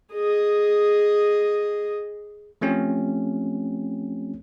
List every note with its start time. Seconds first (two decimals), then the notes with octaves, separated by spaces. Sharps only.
0.13 G#4 D#5
2.61 F3 A3 C4 C#4 G4